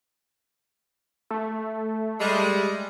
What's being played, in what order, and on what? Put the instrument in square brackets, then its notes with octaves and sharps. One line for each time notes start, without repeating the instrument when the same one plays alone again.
[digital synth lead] A3
[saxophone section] G3 G#3